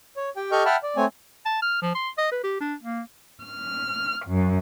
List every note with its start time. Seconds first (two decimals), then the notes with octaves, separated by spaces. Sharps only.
0.17 C#5
0.36 G4 G5
0.52 G4 A4 D#5 C#6 F6 G6
0.65 E5 F#5 G5 A5 B5 F6
0.83 D5
0.97 A3 C4 C#5 G#5
1.46 A5
1.62 F6
1.82 F3
1.95 C6
2.18 D#5
2.32 B4
2.44 G4
2.61 D4
2.82 A#3
3.44 F6
4.26 F#2